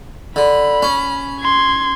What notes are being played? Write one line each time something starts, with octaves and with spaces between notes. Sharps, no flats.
D3 B5
C#4
C6 G#6